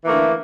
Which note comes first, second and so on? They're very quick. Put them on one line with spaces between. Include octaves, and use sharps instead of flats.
E3 A#3 A3 D3